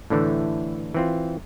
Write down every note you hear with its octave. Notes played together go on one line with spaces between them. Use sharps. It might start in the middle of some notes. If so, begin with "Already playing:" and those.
A2 D3 E3 A3
E3 C4 F4